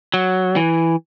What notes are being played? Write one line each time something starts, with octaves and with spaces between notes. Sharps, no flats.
F#3
E3